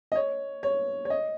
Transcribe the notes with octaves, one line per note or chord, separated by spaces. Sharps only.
D#5
C#5
C#5
C#5
D#5